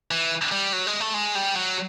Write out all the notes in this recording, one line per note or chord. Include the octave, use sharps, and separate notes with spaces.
E3
G3
F#3
G#3
A3
G#3
G3
F#3